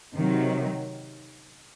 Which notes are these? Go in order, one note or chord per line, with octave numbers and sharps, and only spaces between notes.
C3 D#3 F#3